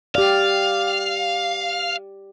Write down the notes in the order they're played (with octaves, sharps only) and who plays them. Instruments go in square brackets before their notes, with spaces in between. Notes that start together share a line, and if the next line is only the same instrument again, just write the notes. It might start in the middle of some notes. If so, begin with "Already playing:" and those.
[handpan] G4 D5 [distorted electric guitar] F5